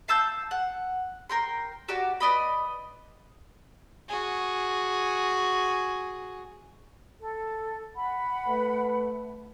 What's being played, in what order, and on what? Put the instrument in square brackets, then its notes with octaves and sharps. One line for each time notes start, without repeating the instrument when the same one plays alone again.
[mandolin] F5 A5 E6 G6
F#5
A#4 G5 C6
F#4 G4 D5
B4 D5 D#5 B5
[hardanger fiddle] F#4 G#4
[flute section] A4
F#5 B5
[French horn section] A3 B4